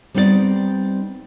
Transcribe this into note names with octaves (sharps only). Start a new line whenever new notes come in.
G3 B3 C4 D#4 E4 D5